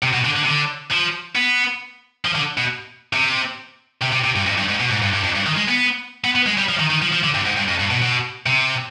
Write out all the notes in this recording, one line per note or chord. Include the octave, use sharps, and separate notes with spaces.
C3
B2
D3
D3
C3
D3
F3
B3
F3
D3
B2
C3
C3
C3
C3
G2
F2
G2
G#2
B2
G#2
G2
G2
F2
G2
D#3
G#3
B3
B3
B3
G#3
G3
F3
D#3
D#3
F3
F3
D3
G2
G#2
G2
F2
G2
B2
B2
C3